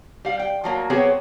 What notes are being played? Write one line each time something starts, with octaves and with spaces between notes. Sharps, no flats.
G3 F5
G5
F3 F#3 A#3
F#3 B3 C4 G4 G#4 C#5